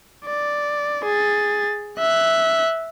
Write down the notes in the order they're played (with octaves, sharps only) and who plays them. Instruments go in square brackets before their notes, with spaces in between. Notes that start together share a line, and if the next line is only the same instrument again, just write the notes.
[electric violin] D5
G#4 A6
E5 F#6